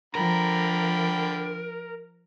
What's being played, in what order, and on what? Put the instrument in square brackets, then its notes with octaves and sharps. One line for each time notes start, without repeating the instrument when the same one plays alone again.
[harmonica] D3 G5 B5 [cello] F3 [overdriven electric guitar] A#4